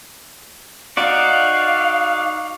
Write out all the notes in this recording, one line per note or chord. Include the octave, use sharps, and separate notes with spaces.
D#4 F#4 D5 F5